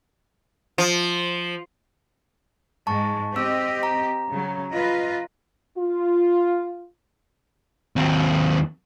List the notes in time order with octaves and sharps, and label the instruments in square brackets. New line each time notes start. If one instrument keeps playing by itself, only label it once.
[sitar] F3
[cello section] G#2 G#3 [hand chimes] A5 C#6
[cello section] C4 G4 D#5 [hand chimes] E6
[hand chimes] A#5
[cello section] C#3 F#3
F4 B4 D#5
[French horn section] F4
[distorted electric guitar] D#2 C4